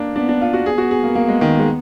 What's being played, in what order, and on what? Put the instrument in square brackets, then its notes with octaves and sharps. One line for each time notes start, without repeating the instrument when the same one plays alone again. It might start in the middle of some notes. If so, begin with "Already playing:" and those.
Already playing: [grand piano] A#3 D4
[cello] B3 [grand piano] D4
[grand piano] D4
F4
F#4
[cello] B3 [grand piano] G#4
[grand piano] F#4
G#4
A#3
A#3
G#3
D#3
G#3